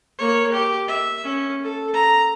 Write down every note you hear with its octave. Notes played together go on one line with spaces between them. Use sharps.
A#3 C#5
G4
E5
C#4
A4
A#5